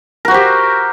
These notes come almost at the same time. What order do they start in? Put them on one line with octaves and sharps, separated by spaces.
A#4 F#4 C5 G4